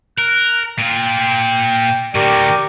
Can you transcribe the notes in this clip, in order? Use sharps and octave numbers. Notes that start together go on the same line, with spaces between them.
A#4 F#6
A#2 F4 G5
A2 D3 G4 A#4 D5 C#6